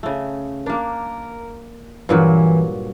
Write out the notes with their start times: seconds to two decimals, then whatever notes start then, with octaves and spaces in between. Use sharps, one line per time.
0.03 C#3 A3
0.66 A#3 D4 A#4
2.09 G2 A#2 E3 F#3